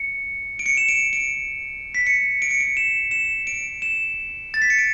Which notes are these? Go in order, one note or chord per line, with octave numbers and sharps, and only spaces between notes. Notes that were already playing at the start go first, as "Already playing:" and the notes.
Already playing: C#7
D7
C#7
E7
D7
D7
B6
C#7
D7
C#7
D7
E7
E7
D7
E7
A6
B6
C#7
D7